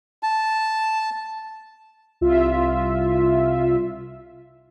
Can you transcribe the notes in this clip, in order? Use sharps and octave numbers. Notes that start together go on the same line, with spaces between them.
A5
C2 F4 E5